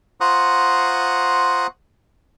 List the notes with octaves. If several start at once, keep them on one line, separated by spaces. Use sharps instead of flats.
F4 C5 F#5 A#5 C#6 D#6